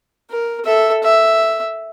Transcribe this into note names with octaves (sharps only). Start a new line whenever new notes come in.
A#4
A4 E5
E5